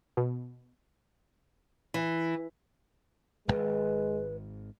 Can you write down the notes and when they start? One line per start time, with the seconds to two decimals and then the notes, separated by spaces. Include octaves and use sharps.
0.17 B2
1.94 E3
3.48 D1 G#1 G#3 B4